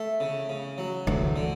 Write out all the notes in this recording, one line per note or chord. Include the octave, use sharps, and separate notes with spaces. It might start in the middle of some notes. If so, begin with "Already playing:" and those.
Already playing: A3
C#3
C#3
F#3
D2 E3
D3